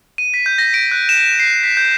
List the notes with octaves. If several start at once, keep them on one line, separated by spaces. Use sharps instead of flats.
D#7
B6
G6
A#6
D7
F#6
E7
C7
B6
G6